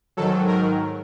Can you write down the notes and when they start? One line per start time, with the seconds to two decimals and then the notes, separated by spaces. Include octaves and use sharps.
0.17 G#2 D#3 F#3 A4
0.48 A#4